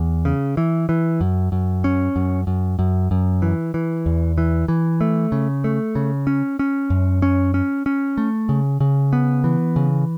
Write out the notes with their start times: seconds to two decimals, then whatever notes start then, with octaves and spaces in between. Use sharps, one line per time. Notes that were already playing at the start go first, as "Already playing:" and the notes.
Already playing: E2
0.25 C#3
0.57 E3
0.89 E3
1.21 F#2
1.52 F#2
1.84 C#4
2.16 F#2
2.47 F#2
2.79 F#2
3.11 F#2
3.42 E3
3.74 E3
4.06 E2
4.38 E3
4.68 E3
5.01 A3
5.32 C#3
5.64 A3
5.95 C#3
6.27 C#4
6.59 C#4
6.90 F#2
7.22 C#4
7.54 C#4
7.86 C#4
8.18 A3
8.49 C#3
8.81 C#3
9.13 B3
9.44 E3
9.76 C#3